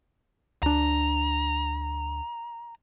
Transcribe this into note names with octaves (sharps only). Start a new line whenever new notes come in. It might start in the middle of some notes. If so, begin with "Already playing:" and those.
D2 D4 A#5